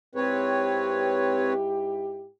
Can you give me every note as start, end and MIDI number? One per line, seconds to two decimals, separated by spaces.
0.15 2.30 44
0.15 1.53 60
0.15 2.30 64
0.15 2.30 67
0.15 1.53 71
0.15 1.53 73